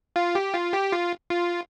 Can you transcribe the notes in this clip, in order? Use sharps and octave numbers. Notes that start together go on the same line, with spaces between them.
F4
G4
F4
G4
F4
F4